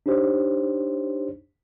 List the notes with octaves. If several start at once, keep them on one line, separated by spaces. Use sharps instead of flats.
D4 D#4 G4 C5 C#5